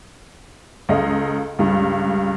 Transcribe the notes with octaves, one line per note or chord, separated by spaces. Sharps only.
C#2 A4 D#5 F5
C#2 G2